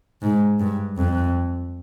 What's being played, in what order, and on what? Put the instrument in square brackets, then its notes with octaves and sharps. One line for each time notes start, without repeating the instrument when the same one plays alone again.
[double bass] G#2
G2
F2